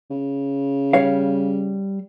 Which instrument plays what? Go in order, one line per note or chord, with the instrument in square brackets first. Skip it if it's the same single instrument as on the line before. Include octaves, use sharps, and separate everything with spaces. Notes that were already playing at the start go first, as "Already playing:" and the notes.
[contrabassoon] C#3
[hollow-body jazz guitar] G3 C#5 F5